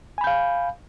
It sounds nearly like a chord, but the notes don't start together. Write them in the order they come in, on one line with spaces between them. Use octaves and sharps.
G#5 B5 G6 F5